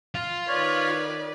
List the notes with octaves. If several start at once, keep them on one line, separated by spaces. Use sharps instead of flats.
F4
D#3 B4 C#5 D5